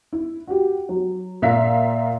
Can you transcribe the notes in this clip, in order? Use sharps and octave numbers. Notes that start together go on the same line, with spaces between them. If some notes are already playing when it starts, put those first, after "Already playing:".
E4
F#4 G4
F#3
A#2 E5 F5 B6